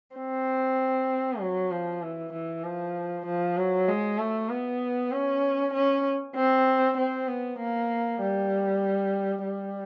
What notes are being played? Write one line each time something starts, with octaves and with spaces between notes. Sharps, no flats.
C4
F#3
F3
E3
E3
F3
F3
F#3
G#3
A3
B3
C#4
C#4
C4
C4
B3
A#3
G3
G3